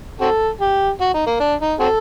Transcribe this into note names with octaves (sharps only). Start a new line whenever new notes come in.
C4 F#4 A4
G4
F#4
D#4
A#3
D4
D#4
C4 F#4 A4